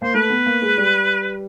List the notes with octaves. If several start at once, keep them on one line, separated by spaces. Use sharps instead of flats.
A#3 C5
A3 B4
B3
A#3
G#3
G3